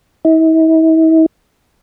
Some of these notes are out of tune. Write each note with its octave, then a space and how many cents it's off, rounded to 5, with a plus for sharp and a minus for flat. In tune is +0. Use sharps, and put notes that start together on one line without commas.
E4 -45